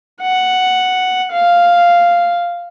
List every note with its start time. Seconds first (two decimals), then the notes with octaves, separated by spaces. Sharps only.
0.22 F#5
1.32 F5